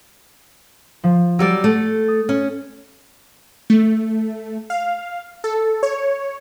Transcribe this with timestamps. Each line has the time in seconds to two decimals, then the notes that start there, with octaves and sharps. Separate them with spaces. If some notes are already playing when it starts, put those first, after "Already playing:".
1.04 F3
1.39 F#3 G3 D5 E6 A6
1.64 A3 A4
2.08 D#6
2.29 C#4
3.70 A3
4.70 F5
5.44 A4
5.83 C#5